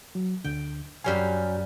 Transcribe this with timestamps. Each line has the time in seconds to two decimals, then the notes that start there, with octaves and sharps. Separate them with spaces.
0.15 F#3
0.44 D2 D3 G5
1.04 F#2 G3 G4 C#5 F5 G#5